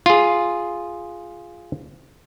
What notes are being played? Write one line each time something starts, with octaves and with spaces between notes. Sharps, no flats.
F4 G#4